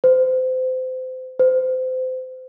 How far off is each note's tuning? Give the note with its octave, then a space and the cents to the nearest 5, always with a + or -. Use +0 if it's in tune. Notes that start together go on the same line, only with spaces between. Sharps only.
C5 -30
C5 -30